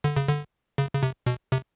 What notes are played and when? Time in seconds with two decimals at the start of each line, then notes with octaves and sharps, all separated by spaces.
0.04 D3
0.17 C#3
0.28 D3
0.78 C#3
0.93 C#3
1.03 C3
1.26 B2
1.52 C3